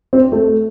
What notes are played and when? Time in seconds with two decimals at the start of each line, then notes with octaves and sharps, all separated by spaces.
0.13 C4
0.32 A3